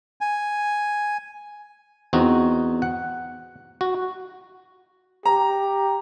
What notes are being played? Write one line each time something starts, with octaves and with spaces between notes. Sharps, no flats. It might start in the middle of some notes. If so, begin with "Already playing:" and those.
G#5
E2 C4 D#4 F#4
F#5
F#4
G4 A#5